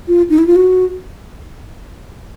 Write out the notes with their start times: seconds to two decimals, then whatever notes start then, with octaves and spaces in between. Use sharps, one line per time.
0.08 F4
0.30 D#4
0.38 E4
0.47 F4
0.56 F#4